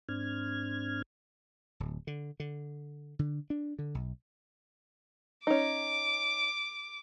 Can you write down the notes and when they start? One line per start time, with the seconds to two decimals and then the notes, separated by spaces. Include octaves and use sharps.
0.09 G#2 C4 D4 F6 G#6
1.80 D1
2.07 D3
2.40 D3
3.19 D3
3.50 D4
3.79 D3
3.95 B1
5.47 C#4 D#4 D6